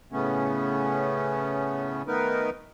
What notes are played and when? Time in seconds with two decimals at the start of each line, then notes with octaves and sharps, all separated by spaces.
0.12 A2 C#3 A3 B3 C#4
2.07 D#3 A3 B3 D#4 A#4 B4